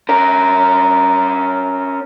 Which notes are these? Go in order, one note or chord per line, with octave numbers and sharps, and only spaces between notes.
C#4 A#4